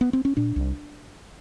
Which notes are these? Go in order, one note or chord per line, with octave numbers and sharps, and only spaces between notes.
B3
C4
C#4
A#2 D4
C2